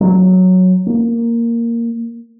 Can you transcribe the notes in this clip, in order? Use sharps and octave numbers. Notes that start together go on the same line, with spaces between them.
F#3
A#3